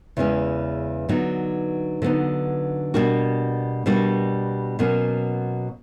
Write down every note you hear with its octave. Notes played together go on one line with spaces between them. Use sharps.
E2 C#3 E3 G#3 C#4
D3 F#3 B3 D#4
D3 F#3 B3 D#4
B2 G3 A#3 D4 F#4
B2 G3 A#3 D4 F#4
B2 F#3 A#3 C#4